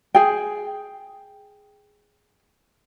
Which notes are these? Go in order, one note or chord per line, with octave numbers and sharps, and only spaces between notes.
G#4 G5